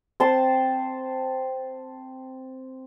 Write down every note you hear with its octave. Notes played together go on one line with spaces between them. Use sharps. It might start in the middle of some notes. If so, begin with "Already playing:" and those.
C4 A5 C6